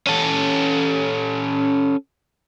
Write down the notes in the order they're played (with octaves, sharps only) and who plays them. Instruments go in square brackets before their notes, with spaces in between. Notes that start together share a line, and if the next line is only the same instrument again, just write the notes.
[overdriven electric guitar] C#4 A4